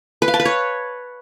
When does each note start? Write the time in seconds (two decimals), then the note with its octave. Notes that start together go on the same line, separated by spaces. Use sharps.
0.22 B4
0.28 F5
0.34 A5
0.40 B4
0.45 C#5